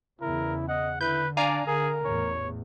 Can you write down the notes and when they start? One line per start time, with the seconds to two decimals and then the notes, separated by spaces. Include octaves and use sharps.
0.21 E2 C#3 E4 A#4
0.68 D#5 F#5
1.01 D3 E4 B4 G6
1.37 D4 D5 F5 G#5 A#5
1.67 D3 G#4 A#4
2.05 A1 E2 C#5